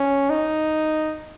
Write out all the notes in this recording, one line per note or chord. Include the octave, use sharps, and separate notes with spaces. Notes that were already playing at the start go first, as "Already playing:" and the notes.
Already playing: C#4
D#4